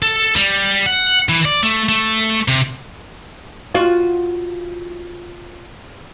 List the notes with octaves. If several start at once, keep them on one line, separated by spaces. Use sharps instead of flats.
A4
G3
F#5
E3
D5
A3
A3
C3
F4 F#4